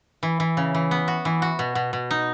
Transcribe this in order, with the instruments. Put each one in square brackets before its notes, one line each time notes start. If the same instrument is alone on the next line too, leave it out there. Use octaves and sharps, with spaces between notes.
[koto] E3
E3
C#3
E3
B3
F#4
E3
F#4
B2
B2
B2
D#4